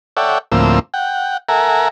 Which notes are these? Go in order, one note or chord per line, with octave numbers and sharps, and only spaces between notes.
A4 C#5 D5 E5 F#5 G5
D2 A2 F3 A#3 C4 E6
F#5 G5
A4 A#4 E5 F#5 G#5 A#5